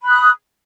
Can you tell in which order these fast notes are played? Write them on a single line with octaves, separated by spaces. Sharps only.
B5 F#6 D#6